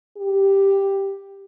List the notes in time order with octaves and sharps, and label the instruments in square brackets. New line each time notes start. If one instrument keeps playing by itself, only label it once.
[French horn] G4